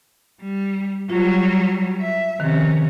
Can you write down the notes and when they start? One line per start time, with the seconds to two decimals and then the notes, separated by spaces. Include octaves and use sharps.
0.42 G3
1.10 F#3 G3 F4
2.00 E5
2.40 C3 D#3 F3 C#4